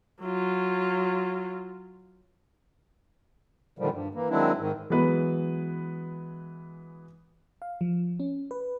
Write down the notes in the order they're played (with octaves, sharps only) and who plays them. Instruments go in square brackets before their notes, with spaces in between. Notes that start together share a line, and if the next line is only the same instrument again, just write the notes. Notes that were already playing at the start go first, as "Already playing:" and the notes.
[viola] F#3 F4
[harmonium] A#2 D3 D#3 F3 G3
G2
E3 A#3
D#3 F#3 G#3 C4 D4 E4
G#2 D#3
[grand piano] E3 F#3 G#3 B3 B4
[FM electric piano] F5
F3
C#4
B4